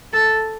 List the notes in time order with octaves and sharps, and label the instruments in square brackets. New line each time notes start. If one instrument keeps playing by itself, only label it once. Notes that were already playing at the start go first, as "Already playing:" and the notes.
[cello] A4